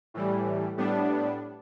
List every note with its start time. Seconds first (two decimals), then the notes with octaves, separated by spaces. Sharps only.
0.14 A2 E3 G3
0.77 A2 G3 B3 D4